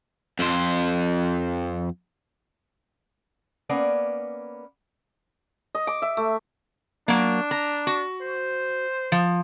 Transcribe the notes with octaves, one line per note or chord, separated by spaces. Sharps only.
F2 C5
A#3 B3 C#4 D5
D#5
D6
E5
A3
F#3 A#3 D4
A#5
F#4
C5
F3